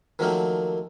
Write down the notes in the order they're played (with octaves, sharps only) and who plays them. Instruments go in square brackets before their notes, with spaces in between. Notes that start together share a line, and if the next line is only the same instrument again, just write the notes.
[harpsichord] D#3 F3 F#3 A3 A#3 C4